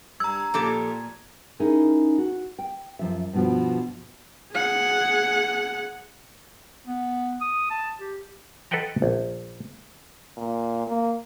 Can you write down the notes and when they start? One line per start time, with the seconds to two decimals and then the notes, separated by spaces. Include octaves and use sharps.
0.20 G2 A#5 E6 G#6
0.54 A#2 F3 G4 A4
1.60 C#4 D#4 E4 G#4 A#4
2.18 F#4
2.59 G5
2.99 F#2 F3 E5
3.33 G2 B2 F3
4.53 G#4 F#5
6.87 B3
7.41 D#6
7.70 A5
7.99 G4
8.71 A4 B4 D#5 F#5 G5 A#5
9.02 A#1
10.37 A#2
10.87 A#3